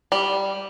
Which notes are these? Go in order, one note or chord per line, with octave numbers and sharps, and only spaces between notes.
G3